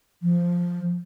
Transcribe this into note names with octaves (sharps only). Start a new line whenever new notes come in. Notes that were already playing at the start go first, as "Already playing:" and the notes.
F3